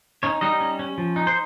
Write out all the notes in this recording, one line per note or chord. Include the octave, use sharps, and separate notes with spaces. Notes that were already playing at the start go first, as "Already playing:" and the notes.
C#4 D#4 C#5
G3 D#4 D#5
C#4
C#4
F3
D#4
C5